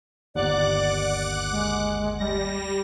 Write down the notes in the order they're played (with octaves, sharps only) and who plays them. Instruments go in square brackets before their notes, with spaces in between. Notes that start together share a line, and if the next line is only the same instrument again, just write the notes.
[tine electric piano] G1 D#2 [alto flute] D5 [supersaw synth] F#5 D6 F#6
[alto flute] G#3
[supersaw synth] G3 A#6